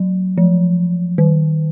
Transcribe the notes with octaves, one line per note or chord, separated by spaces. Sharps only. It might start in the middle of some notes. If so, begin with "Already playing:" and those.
Already playing: F#3
F3
D#3